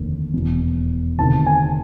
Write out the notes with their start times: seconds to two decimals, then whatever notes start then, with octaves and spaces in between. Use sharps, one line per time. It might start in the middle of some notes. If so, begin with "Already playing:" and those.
Already playing: F1 D#2 D3
0.33 E1 E2 B2
1.18 D2 C3 D#3 A5
1.46 G#5